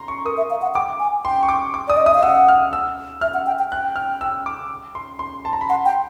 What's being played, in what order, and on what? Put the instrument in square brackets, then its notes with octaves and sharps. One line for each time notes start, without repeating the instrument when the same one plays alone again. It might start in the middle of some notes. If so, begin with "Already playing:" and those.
Already playing: [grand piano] A#5 C6
C#6
[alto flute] A#4 [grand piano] D#6
[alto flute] E5
F5
F#5
[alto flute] G5 [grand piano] D6
[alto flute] G#5
[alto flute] G5 [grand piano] C6
[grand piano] C#6
D6
D6
[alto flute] D5 [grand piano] D#6
[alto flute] D#5
[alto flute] E5 [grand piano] D#6
[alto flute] F5
[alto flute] F#5 [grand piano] E6
[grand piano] F6
E6
[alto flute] E5 [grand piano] F6
[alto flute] F#5
G5
G5
[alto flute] G5 [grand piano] F#6
[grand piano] F6
E6
D6
C6
C6
A5
A#5
B5
[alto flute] F#5 [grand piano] C6
[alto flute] G5